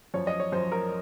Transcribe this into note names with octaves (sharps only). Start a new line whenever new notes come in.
F#2 F3 C#5
D#5
C#5
F#2 F3 C5
A#4